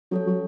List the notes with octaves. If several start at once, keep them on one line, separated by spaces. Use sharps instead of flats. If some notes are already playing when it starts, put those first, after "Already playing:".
F#3 C#4 A4 C#5
F#3